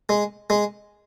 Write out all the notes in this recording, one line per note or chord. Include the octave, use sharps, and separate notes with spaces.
G#3
G#3